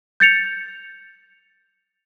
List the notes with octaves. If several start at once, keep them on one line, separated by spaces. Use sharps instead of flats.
G6 A6 C#7 F7